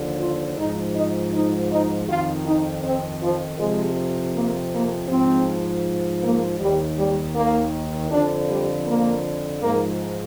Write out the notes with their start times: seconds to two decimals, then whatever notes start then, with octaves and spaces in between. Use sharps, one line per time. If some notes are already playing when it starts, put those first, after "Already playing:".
Already playing: D#2 D3 F3
0.20 F4
0.57 G#2 F3 D#4
0.94 D#4
1.33 D#4
1.71 D#4
2.07 F2 D#3 F4
2.45 D#4
2.83 C4
3.21 F3
3.59 F2 C3 F3 G#3
4.34 A#3
4.72 A#3
5.09 G#2 F3 C4
6.23 A#3
6.59 D#2 D#3 G3
6.98 G3
7.35 A#3
8.10 F2 D3 F3 D4
8.48 G3
8.85 A#3
9.61 G#2 F3 A#3